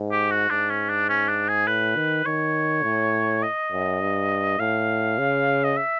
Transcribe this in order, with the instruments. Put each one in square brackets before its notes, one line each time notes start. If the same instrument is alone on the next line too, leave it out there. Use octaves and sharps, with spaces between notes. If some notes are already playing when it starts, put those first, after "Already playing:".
Already playing: [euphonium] G#2
[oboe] G4
F#4
[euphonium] G#2 [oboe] D4
[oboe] C#4
D4
C#4
D4
G#4
[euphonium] A2 [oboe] B4
[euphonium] D#3
[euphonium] D#3 [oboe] C#5
[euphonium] A2
[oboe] D#5
[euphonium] F#2
G2
[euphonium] A2 [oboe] F5
[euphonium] C#3
[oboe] D#5
E5